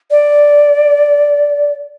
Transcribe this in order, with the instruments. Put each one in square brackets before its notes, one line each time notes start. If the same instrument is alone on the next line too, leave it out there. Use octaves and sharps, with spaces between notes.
[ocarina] D5